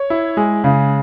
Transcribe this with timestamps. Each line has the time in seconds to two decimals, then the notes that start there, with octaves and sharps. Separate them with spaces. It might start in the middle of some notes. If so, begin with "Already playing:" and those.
Already playing: C#5
0.10 E4
0.37 G#3
0.64 C#3